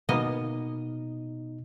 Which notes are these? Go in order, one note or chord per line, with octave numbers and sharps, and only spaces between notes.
B2 A#3 B3 D#4 D#5